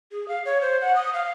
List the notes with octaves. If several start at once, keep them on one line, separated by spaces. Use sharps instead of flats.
G#4
F5
C#5
C5
F#5
D#6
F5